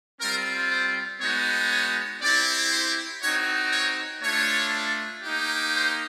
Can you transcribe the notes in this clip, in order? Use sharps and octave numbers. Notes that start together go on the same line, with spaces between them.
G3 C4 F4 A#4
C5
G#3 B3 D#4 F#4 C#5
C#5
C4 E4 G4 D5
C5
C4 D#4 F#4 C#5
C#5
A3 D4 F4 C#5
A#3 D#4 G4
C5